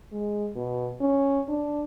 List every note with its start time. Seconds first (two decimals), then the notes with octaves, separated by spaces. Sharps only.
0.12 G#3
0.55 B2
1.01 C#4
1.49 D4